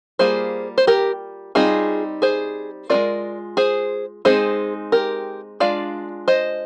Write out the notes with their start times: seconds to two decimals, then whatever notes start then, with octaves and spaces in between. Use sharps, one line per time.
0.19 G3 A#3 F4 G#4 C5
0.78 C5
0.87 G4 A#4
1.55 G3 C4 D#4 F4 G#4
2.22 G#4 C5
2.90 G#3 D4 F4 A#4 D5
3.57 G#4 C5
4.25 G#3 C4 D#4 G#4 C5
4.92 G4 A#4
5.60 G#3 D4 F4 D5 F5
6.28 C5 D#5